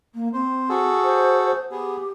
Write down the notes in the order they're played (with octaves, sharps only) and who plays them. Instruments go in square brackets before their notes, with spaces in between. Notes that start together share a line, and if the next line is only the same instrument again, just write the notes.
[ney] A#3
[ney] C4 [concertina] C5
[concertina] F#4 G#4 A4
[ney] C5
[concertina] B3 G#4 [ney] G4